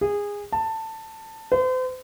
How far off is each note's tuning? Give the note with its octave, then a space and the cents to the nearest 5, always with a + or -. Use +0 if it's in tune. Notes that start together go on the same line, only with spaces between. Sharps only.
G#4 -20
A5 +15
C5 -40